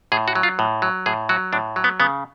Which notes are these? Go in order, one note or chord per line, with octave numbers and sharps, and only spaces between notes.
A2 G#4
F#4
F#3
F4
A2
F#3
A2 G#4
F#3 F#4
A2 D4
F#3
B3
C#3 B3